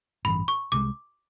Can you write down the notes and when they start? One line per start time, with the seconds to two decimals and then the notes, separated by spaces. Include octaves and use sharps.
0.25 A1 G2 E3 B5
0.48 C#6
0.72 C2 C3 F3 G#3 D6